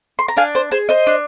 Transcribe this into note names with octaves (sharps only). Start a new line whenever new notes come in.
C6
A#5
D4 F5 G#5
C5
G#4 C5
C5 D#5
D4